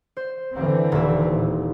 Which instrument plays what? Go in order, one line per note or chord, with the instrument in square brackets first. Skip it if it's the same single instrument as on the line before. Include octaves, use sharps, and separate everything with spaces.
[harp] C5
[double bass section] D3 E3 C4
[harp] D#1 E4
[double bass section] A#2